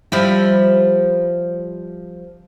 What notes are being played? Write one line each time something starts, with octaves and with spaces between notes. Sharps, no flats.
F3 G3 E4